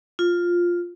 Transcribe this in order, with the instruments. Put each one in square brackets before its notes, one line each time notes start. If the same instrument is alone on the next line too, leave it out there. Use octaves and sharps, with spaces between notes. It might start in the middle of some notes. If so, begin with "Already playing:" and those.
[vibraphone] F4